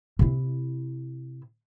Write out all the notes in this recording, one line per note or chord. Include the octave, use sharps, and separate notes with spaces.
C3 E4